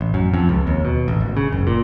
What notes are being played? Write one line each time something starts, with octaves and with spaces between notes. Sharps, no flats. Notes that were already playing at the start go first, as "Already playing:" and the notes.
A1
F#2
F2
C#2
D#2
B2
A1
G#1
C#3
F#1
A#2